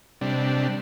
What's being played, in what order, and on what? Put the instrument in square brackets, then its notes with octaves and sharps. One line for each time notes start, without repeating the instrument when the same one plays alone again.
[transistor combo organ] C3 G3 D4